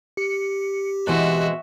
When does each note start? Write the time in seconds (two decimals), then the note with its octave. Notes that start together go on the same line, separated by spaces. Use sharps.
0.17 G4 C#7
1.07 B2 E3 G#3 C4 F#4 E5 F#6